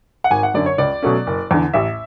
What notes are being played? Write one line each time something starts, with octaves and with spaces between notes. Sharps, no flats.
F#5
G#1 G#5
F#5
F#2 D3 D5
C#5
C#2 D5
B2 F#3 A3 C#4
F#1
E2 D3
A1 E5